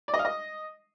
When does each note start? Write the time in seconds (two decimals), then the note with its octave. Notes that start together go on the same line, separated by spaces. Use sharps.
0.08 D5
0.14 D#5
0.19 F5
0.25 D#5